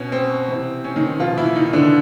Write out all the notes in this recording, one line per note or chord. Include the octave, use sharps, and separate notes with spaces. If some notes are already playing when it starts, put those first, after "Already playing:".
Already playing: B2 C#4
C4
C3 E3
C#4
D#3 D#4
B2 F3 F4
E3 E4
D#3 D#4
D3 D4